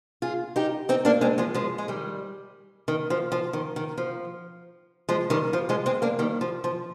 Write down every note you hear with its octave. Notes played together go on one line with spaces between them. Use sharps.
F4 G#4
D#4 G4
C4 D#4
A#3 D4
G#3 C4
F3 G#3
F3 G#3
G#3
D#3 G3
D#3
F3
F3
D#3
D#3
F3
F3 G#3
D#3 G3
F3
F3 G#3
G#3 C4
A#3 D4
D#3 G3
F3
F3